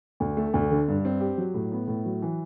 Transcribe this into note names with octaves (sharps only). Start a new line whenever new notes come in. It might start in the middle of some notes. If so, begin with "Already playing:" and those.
D2
A3
D2
D3
G2
C4
G4
F#3
A2
B3
A2
F#3
E3